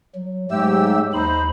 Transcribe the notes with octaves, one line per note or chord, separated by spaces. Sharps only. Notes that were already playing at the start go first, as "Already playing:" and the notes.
F#3
G#2 F#3 G#3 A3 G4 E6
D#2 D#4 C5 B5